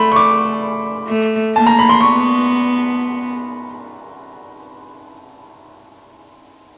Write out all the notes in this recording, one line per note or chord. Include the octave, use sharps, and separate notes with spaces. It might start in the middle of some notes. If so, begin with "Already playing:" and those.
Already playing: A3 B5 C6
C#6
D6
A3
A#3 A5
A#5
B5
C6
B3 C#6